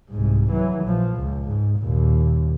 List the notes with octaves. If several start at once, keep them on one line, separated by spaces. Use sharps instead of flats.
C2 G#2
E3 F#3
A#1 F3
C#2
G#2
D#2 A#2